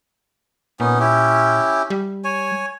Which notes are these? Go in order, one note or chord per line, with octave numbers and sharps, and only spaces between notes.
A#2 B3 C#4 D#4
C#4 E4 G4
G3
C#5 G#5